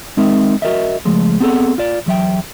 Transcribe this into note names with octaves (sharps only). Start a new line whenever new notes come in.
G#3 C4 D#4 A#4 E5
F#4 A#4 D#5 E5
C#2 F3 G#3 A3
B3 C4 F#4 G#4 A4 F#5
F4 D5
E2 F#3 E5 G5